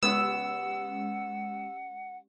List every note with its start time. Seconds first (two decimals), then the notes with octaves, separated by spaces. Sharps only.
0.03 C#3 G#3 B3 C#4 G4 F#5 D#6 E6